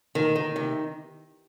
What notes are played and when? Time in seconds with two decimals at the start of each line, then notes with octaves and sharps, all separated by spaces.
0.15 D#3
0.36 D#3
0.56 C3